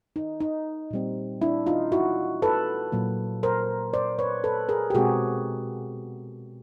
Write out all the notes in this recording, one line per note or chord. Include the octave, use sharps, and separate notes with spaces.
D#4
D#4
A#2 G3 C4
D4 E4
D#4 F4
E4 F#4
A4 B4
A#2 F#3 A#3
A#4 C5
C5 D5
B4 C#5
A4 B4
G#4 A#4
G4
B2 G#3 C4 F#4 G#4